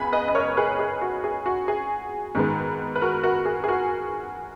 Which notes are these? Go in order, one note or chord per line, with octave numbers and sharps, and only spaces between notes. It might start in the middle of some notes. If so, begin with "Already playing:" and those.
Already playing: C#2 C#3 G#3 B3 G#5 B5
B4 D#5
D#5
A#4 C#5
G#4 B4
G#4
F#4
G#4
F#4
G#4
G#2 D#3 G#3 B3
B4
F#4 A#4
F#4 A#4
G#4
G#4
F#4 A#4